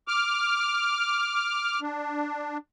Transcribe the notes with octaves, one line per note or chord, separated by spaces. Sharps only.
D6 F6
D4